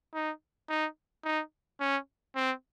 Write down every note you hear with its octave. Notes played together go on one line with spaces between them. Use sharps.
D#4
D#4
D#4
C#4
C4